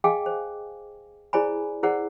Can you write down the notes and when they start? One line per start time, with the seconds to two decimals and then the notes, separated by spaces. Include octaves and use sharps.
0.04 G#4 D#5 F5 G5 G#5 D6
0.26 C5
1.33 E4 G#4 C5 D5 G#5 B5
1.83 E4 G#4 A#4 C5 D5 F#5